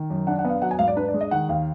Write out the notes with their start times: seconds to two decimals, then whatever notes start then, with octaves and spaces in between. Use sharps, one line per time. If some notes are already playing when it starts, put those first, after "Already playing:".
Already playing: D#3
0.10 F#2
0.27 D4 F#5
0.39 F#5
0.45 B3
0.50 F5
0.62 F#3 F#5
0.71 G#5
0.79 G#2 F5
0.88 D5
0.96 D4 B4
1.08 D5
1.14 G#3
1.21 D#5
1.31 D#3 F#5
1.49 D#2 F5